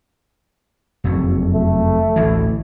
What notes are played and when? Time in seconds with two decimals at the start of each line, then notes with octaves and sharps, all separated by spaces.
1.04 F#1 F2 F#3
1.53 A3
2.16 A1 D2 E3